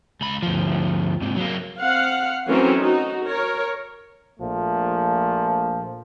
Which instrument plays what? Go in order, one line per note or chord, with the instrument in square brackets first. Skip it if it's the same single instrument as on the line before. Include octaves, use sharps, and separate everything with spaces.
[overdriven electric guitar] C#2 B5
D2 F3
G#2 C3
F#3 A#3
[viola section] C4 F5 F#5
E3 F#3 A3 C4 C#4 A#4
D#4 F#4
A#4 C#5
[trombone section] A#1 A#2 F3 A3